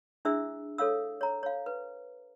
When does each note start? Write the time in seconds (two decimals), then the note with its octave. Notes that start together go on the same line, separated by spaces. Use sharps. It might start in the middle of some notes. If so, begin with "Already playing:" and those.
0.25 D4 E4 G#4 C5 E5 E6
0.78 A4 C#5 F5 E6
1.21 C#5 A#5
1.43 C#5 F5
1.66 B4